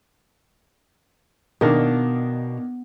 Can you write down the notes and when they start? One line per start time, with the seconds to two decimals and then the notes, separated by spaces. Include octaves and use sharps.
1.61 B2 D#3 A#3 D4